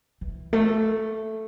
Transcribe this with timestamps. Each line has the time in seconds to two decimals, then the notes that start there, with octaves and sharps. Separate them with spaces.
0.21 E3
0.53 A3